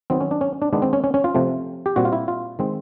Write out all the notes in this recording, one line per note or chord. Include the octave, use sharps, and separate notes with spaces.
D#3 F#3 B3 C4
C#4
D4
C#4
D4
D#3 G#3 B3 D4
C4
C#4
C#4
C#4
F4
C3 F3 A3 C4
G4
A#2 G3 C4 F#4
F4
E4
F4
D#3 G#3 C4